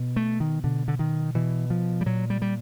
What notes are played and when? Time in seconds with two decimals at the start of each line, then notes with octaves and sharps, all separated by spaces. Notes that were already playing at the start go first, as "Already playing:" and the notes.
Already playing: B2
0.16 A3
0.40 D#3
0.64 B2 D3
0.88 D3
0.99 D#3
1.35 B2 E3
1.70 F3
2.01 G3
2.06 A#2 F#3
2.30 G3
2.42 G3